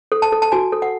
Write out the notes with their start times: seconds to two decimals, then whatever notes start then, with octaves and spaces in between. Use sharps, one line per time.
0.12 A4
0.22 A5
0.32 A4
0.42 A5
0.52 F#4 G#5
0.72 A4
0.82 F#5